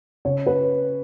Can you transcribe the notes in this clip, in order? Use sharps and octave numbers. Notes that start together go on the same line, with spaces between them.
C#3 C#5
B4